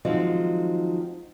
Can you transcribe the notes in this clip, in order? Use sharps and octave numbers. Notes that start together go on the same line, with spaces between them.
D#3 F3 F#3 G#3 C4 D#4